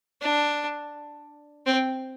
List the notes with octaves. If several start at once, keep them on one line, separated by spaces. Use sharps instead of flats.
D4
C4